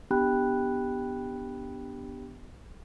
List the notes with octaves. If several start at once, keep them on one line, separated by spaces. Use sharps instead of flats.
B3 D4 G4 G5 B5 F#6